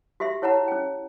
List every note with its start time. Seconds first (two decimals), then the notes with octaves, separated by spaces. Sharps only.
0.20 F#4 G4 E5 C6
0.42 E4 C#5 F#5 A5 A#5
0.68 C#4 G5